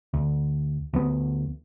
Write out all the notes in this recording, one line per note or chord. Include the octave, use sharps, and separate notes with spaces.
D2
D2 F3 B3